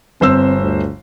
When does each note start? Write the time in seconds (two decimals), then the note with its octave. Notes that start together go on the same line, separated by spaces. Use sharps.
0.21 G1 C4 C5 E6
0.61 D2